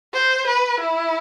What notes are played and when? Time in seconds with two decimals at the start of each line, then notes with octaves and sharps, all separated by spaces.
0.14 C5
0.47 B4
0.80 E4